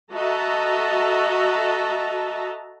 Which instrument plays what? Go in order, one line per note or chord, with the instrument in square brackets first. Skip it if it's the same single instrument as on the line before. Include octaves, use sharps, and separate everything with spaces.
[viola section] F#4 A4 D#5 E5 A5 A#5